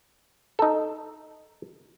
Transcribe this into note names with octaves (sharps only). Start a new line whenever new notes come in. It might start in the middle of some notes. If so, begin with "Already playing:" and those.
D#4 A4